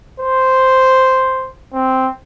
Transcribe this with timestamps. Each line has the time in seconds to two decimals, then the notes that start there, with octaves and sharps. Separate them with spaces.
0.20 C5
1.73 C4